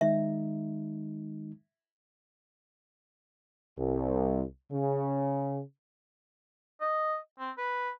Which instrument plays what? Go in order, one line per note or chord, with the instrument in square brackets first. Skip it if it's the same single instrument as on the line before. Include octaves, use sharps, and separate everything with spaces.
[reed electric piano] D#3 G#3 D#4 [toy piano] E5
[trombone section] C2
C#3
[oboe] D#5
C4
B4